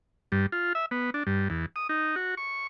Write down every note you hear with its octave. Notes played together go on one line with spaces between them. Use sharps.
G2
F4
E5
B3
D4
G2
E2
D#6
D#4
F#4
C#6